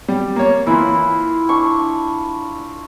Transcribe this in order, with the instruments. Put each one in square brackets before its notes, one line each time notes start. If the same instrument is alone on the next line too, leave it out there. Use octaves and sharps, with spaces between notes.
[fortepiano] G3
A#3 C#5
[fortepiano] E3 A#3 [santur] E4 F4
[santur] D4 C#6